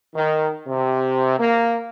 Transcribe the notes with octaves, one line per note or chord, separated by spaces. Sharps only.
D#3
C3
A#3